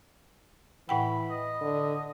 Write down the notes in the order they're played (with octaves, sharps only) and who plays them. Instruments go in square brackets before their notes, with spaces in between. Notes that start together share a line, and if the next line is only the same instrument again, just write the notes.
[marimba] A2 F#5 G5 [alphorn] E3 [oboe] B5
[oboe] D#5
[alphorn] D3